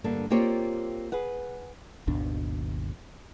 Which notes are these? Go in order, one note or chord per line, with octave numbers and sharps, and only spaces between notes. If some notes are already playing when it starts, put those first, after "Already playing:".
G2 D3 A#3 D4
A#3 C4 F4 G4 C#5 D5
G#4 B4 F#5
G#1 D#2 B2 D4